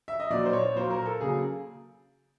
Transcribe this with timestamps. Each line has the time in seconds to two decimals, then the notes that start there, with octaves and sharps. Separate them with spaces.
0.08 E5
0.20 D#5
0.30 A#2 F#3 A#3 D5
0.45 C5
0.53 C#5
0.76 A#2 F#3 A#3 C5
0.90 A#4
1.06 A4
1.21 C#3 F#3 A#3 G#4